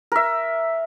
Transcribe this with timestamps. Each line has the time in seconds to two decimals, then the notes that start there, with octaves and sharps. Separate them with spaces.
0.12 A#4 E5